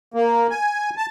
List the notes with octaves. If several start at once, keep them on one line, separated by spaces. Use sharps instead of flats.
A#3
G#5
A5